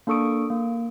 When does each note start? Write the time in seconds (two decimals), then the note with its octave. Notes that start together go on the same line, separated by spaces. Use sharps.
0.07 A#3 D4 A4 C#6 D#6 D7
0.50 A#3